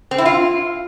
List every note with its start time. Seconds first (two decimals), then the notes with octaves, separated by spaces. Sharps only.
0.11 C4
0.18 E4
0.26 F4